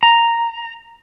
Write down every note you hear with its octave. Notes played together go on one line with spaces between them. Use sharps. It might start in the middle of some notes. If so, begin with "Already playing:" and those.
A#5